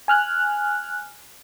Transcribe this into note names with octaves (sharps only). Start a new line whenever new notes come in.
G#5 F6 F#6